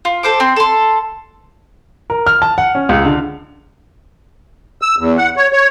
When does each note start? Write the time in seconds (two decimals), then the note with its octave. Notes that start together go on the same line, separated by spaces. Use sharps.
0.05 F4
0.23 A4 C5 D6
0.40 C4 C6
0.56 A4 C6
2.10 A#4
2.26 F6
2.42 A5
2.58 F#5
2.75 C#4
2.89 C#2
3.05 D3
4.82 E6
4.98 E2
5.17 F#5
5.36 C#5
5.53 C#5